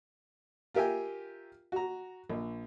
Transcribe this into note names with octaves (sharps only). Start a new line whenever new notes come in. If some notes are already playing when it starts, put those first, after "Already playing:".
F4 G4 A#4 E5 G5 G#5
F#4 A#5
A#1